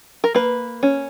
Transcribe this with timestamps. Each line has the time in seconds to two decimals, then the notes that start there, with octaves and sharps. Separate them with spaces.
0.24 A#4
0.34 A#3 B4
0.83 C#4